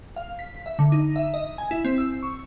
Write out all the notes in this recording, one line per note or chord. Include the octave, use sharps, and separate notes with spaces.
F5
B6
E5
D3
D#4
E5
D#5
G#5
E4
C4
E6
C#6